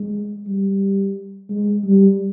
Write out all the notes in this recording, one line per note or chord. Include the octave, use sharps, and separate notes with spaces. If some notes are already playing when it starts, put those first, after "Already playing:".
Already playing: G#3
G3
G#3
G3